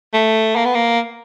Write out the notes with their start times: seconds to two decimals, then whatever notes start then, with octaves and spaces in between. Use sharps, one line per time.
0.14 A3
0.56 A#3
0.65 B3
0.75 A#3